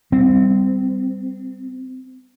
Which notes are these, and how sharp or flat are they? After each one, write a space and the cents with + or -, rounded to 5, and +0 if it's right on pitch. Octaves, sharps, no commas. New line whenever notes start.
G3 +0 C4 -20